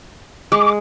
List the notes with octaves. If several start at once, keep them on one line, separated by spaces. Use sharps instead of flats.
G#3 D6